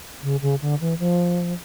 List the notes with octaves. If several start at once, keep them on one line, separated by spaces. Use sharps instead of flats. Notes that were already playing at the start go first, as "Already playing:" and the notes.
C#3
C#3
D3
E3
F3